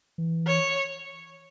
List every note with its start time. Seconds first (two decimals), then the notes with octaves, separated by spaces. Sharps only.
0.18 E3
0.47 C#5